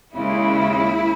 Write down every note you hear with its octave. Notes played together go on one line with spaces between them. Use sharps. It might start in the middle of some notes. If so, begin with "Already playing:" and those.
D#2 C#3 G#3 E4